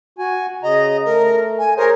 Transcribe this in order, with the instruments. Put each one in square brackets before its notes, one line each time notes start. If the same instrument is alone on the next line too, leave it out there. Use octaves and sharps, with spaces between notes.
[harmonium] F#4 G#5
[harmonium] C#3 A#5 [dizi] D#5
[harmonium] A3 [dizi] A#4
[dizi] G#5
[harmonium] G#4 C5 C#5 [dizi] A#4